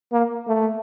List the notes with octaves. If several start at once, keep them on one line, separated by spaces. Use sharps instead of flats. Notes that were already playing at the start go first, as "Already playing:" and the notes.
A#3
A3